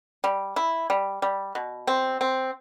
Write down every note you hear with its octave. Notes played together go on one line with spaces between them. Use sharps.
G3
E4
G3
G3
B2
C4
C4